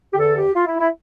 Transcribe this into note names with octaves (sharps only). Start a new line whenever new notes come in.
G4
E2 D3 A4
G4
F4
E4
E4